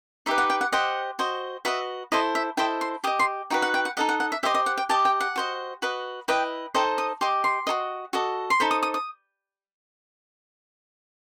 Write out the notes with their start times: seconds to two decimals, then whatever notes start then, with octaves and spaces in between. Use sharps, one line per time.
0.26 D#4 G4 B4 E5
0.38 F#5
0.50 G5
0.61 F#5
0.72 G4 C5 D#5 F#5
1.19 F#4 C5 D#5
1.65 F#4 B4 D#5 E5
2.12 E4 A4 C5 D#5
2.35 E5
2.57 E4 A4 C5 D#5 G5
2.81 C6
3.04 G4 D#6
3.07 D#5
3.19 C6
3.50 D#4 F#4 B4 G5
3.62 F#5
3.74 G5
3.85 F#5
3.97 D#4 A4 D#5 F#5
4.09 F#5
4.20 F#5
4.32 E5
4.43 G4 C5 D#5 E5
4.55 D#5
4.66 F#5
4.78 G5
4.89 G4 D#5 A5
5.05 G5
5.20 F#5
5.36 F#4 C5 D#5
5.82 F#4 B4 D#5
6.28 E4 B4 D#5 G5
6.74 D#4 A4 C5 D#5 G5
6.98 D#6
7.21 G4 D#5 C6
7.44 C6
7.67 F#4 A4 D#5
8.13 F#4 A4 D#5
8.50 C6
8.60 D#4 A4 C5 B5
8.71 D#6
8.83 D#6
8.94 D#6